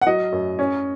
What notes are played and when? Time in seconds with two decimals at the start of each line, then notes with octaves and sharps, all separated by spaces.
0.02 F#5
0.07 F#3 D#5
0.32 F#2
0.59 C#4